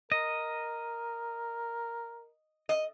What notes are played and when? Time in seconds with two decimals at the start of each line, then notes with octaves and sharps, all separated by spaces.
0.12 A#4 D#5
2.69 D#5